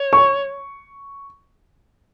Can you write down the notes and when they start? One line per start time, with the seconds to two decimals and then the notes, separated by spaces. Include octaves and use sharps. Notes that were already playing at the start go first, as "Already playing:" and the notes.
Already playing: C#5
0.13 C#6